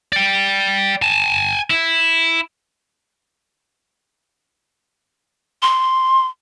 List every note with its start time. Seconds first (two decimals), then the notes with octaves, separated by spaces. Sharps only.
0.13 D5 G5
1.02 G#5 A5
1.70 E4
5.62 C6